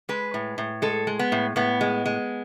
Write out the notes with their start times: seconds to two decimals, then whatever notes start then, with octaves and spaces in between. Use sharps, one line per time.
0.09 G#3 B4
0.34 A2
0.58 A2
0.82 G#3 A4
1.07 G#3
1.19 B3
1.32 A2
1.56 A2 B3
1.81 G#3
2.06 G#3